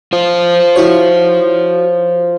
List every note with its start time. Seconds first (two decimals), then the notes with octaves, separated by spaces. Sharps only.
0.13 F4 C5
0.76 E4 F#4 C#5